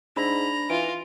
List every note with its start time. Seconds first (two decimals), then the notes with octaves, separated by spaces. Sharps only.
0.17 G#2 D4 A#5 B5
0.70 E3 F4 D7